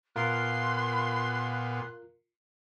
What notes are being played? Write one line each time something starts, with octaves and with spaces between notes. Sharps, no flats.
A#2 B3 F4 A#4 C6 F#6